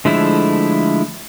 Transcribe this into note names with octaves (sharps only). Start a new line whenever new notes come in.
D3 F3 G#3 A3 E4